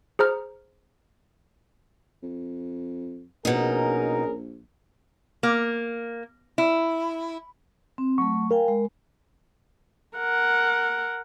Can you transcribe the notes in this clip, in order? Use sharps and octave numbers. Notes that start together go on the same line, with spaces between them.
G#4 C5 A#5 F6
F2
A#1 B2 C#4 D#4 G#4 A#4
A#3
E4
C4
F#3 A3 C#6
A#4 F5 G5 G#5
G#3
A#4 F#5